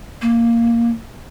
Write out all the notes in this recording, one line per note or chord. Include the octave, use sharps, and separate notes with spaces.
A#3